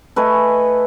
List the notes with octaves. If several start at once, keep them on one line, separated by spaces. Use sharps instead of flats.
A3 B4 D#5 G#5